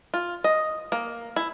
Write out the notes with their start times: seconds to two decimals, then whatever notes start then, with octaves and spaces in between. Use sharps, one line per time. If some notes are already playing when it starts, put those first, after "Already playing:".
0.14 F4
0.44 D#5
0.92 A#3
1.36 E4